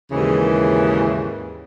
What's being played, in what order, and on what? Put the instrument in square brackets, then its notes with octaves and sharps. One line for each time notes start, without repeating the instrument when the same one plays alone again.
[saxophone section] D#2 G#2 C#3 E3